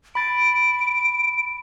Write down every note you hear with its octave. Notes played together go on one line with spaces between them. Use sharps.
B5 A6 D7